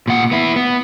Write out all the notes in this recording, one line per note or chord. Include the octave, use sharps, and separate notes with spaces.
A#2 F#5
B3 E4
B3